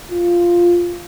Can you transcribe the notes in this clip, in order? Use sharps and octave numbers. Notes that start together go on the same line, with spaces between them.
F4